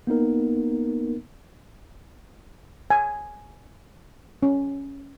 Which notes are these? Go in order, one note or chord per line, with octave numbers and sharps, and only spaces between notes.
A#3 B3 D#4 A#4
G#5
C#4